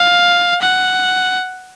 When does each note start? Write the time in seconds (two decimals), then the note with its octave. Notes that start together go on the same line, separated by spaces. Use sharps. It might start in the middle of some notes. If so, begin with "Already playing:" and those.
Already playing: F5
0.62 F#5